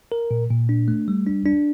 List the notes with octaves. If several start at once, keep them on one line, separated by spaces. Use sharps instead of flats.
A#4
A#2
A#2
D4
A3
G3
D4
D4